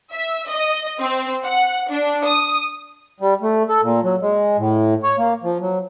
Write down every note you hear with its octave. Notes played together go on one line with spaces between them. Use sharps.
E5
D#5
C4
F#5
D4
D#6
G3
A3
A4
A#2
F#3
G#3
A2
C#5
A#3
F3
F#3